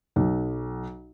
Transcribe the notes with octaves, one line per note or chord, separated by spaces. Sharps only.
B1